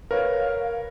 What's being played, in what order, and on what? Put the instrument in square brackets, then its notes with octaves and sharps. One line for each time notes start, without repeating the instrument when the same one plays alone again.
[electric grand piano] A#4 [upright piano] B4 C#5 [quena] F5